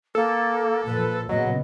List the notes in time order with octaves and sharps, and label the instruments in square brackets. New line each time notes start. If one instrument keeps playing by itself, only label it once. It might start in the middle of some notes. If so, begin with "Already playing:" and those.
[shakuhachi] A#3 [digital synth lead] A4
[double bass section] A#2 F3 [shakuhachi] B4
[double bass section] A#2 C#3 B3 [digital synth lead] F#3 [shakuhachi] D#5